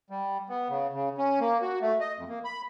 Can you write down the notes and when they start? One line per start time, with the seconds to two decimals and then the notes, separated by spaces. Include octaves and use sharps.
0.10 G3
0.49 B3
0.69 C#3
0.93 C#3
1.18 C#4
1.40 A#3
1.62 F#4
1.82 A3
2.01 D#5
2.18 F2
2.29 A#3
2.45 B5